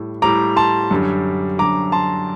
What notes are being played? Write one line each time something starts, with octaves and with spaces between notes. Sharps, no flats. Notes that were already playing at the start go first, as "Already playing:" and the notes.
Already playing: A2 G3
A2 G3 A#5 D6
A5 C6
F#2 D3 G3
F#2 D3 G3 A#5 D6
A5 C6